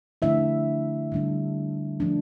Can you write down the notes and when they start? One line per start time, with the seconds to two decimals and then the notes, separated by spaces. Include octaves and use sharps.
0.22 D3 F3 A3 D4 E4 E5
1.12 D3 G3 D4
2.00 F3 A3 D4